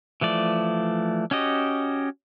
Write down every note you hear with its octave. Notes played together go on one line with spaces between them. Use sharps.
E3 F3 A3 D5
C#4 F#4 G4 D#5